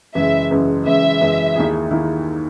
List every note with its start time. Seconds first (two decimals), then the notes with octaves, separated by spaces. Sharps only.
0.15 F#1 F#2 E3 G#3 E5
0.50 F#1 F#2 E3 G#3
0.85 F#1 F#2 E3 G#3 E5
1.21 F#1 F#2 E3 G#3
1.56 D#2 D#3 A#3 E4 G#4
1.91 D#3 A#3 E4 G#4